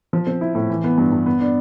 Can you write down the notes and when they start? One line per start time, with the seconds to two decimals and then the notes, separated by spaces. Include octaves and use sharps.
0.13 F3
0.27 C4
0.41 E4
0.55 A2
0.70 E3
0.84 B3
0.98 G2
1.12 G2
1.26 B3
1.40 D4